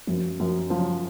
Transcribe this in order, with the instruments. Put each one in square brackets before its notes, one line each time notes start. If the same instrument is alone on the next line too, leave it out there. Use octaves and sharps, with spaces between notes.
[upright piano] F#2 [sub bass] F3
[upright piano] F#2 [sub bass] F3
[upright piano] F3 [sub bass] F#3